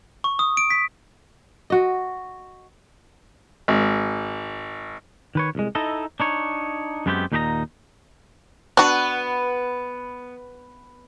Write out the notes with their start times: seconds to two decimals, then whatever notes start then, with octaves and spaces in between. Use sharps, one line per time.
0.24 C#6
0.39 D#6
0.57 D7
0.70 B6
1.70 F#4 D#5
3.68 G#1
5.35 D#3 B4 C#5
5.55 C2 G#3
5.75 D#4 E4 A4 D#5
6.20 D4 D#4 C#5
7.06 F#2 G#3 B3 C4 F#4 G4
7.32 D#2 A#2 D#4 G4 D#5 A#5
8.77 B3 D4 F#4 B4